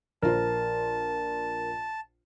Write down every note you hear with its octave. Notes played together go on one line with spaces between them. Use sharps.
A#1 F4 A#4 C5 A5